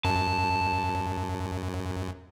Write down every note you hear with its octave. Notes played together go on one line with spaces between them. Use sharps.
F#2 A5